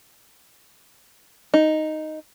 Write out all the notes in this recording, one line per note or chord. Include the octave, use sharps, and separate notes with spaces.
D#4